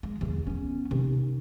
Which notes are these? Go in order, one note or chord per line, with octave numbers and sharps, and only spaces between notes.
G#3
D#1 E2
B3 C#4
C3 D#3